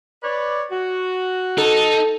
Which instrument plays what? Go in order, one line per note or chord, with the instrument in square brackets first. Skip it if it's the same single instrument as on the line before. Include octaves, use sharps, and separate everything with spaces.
[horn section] B4 C#5 D5
F#4
[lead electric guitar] D#4 [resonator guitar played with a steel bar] A4